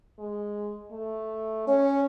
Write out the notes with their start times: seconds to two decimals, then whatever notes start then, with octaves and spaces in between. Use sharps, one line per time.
0.19 G#3
0.91 A3
1.67 C#4 C#5